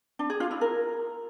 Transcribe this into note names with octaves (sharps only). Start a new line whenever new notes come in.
D4
G#4
F4
E4
A#4